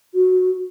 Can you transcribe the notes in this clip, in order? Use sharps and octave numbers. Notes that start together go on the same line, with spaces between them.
F#4